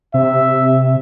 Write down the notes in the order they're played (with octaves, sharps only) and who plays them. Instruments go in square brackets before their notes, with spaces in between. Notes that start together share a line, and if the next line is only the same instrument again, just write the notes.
[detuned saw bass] C3 [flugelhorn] E5